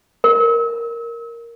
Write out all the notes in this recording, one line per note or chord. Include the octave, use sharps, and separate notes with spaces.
A#4